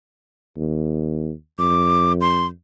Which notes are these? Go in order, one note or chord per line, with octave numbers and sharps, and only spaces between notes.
D#2
F2 D6
C6